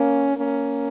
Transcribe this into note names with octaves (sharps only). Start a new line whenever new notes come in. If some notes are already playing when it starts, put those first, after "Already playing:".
Already playing: A#3 C#4
A#3 C#4